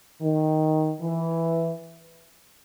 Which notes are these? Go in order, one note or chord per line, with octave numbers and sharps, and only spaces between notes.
D#3
E3